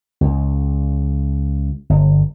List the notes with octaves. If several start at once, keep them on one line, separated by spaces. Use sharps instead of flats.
C#2
G1